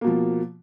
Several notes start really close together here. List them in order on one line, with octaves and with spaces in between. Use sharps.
A#3 B2 F3